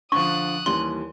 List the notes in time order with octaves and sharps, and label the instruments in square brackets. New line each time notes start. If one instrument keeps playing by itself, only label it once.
[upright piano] D3 F3 [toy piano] C#6 [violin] D#6 F#6
[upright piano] D#2 E3 G3 [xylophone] C6